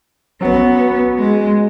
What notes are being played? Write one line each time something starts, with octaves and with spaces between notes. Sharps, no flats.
F#3 B3 C#4 F#4
G#3